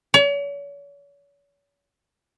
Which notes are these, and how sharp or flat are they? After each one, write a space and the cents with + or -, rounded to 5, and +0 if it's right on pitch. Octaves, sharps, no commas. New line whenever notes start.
C#5 +40